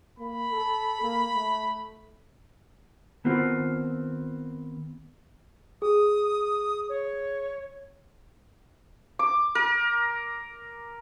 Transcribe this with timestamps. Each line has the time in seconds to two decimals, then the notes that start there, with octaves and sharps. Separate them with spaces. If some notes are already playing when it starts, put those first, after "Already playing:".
0.19 A#3 B5
0.51 A4
1.02 A#3
1.33 A3
3.25 D#3 B3 C4 F4
5.82 G#4 D#6
6.89 C#5
9.19 D6
9.55 A#4